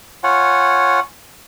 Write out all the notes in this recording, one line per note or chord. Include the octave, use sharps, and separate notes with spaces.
F4 C#5 F#5 G#5